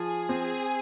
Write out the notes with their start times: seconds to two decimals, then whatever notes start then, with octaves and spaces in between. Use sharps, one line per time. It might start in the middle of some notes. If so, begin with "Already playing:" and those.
Already playing: F3 G#4
0.29 C4